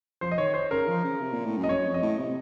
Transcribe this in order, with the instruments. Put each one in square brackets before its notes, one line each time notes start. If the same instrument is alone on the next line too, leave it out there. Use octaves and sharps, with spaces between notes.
[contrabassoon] F3 [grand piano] C5
[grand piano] D#5
[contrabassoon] D#3 [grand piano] C#5
[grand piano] C5
[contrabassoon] C#3 [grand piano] A#4
[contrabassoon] F3
C#3
C3
A#2
A2
F#2
[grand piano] D#5
[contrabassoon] F#2 [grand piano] C#5
[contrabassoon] F2
[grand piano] D#5
[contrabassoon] A2
C3